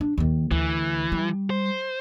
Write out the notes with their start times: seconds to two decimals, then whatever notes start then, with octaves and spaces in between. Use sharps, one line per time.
0.01 D4
0.18 D#2 D#3
0.51 D2 E3
1.12 G3
1.50 C5